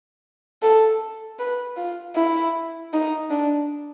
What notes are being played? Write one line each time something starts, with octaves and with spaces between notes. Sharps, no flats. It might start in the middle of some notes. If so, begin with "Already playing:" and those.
A4
B4
F4
E4
D#4
D4